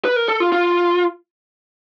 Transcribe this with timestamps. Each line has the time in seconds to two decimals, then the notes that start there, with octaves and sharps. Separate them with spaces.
0.05 B4
0.16 A#4
0.28 A4
0.40 F4
0.52 F4